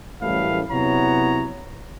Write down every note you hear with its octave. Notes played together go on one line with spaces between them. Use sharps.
A1 F#2 A2 G3 B4 F5
C3 F#3 B3 E4 C#5 A#5